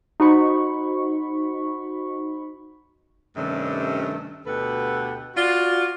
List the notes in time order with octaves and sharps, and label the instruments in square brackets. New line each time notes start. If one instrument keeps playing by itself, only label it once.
[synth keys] D#4 F#4 C5 B5 C#6
[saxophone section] G2 C3 D#3 A3 C#4 D4
D2 B2 G4 A4 B4 F#5
F4 F#4 D5